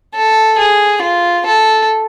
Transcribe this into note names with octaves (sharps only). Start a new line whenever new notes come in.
A4
G#4
F4
A4